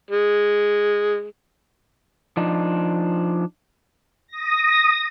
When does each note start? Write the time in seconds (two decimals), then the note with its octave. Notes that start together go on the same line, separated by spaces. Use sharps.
0.10 G#3
2.37 F3 D4 D#4
4.27 D#6 A#6